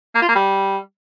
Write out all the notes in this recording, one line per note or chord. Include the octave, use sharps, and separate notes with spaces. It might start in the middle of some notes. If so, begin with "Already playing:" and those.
A#3
F4
A#3
G3